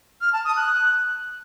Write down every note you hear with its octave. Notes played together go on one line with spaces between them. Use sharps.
F6
A5
D#6
F#6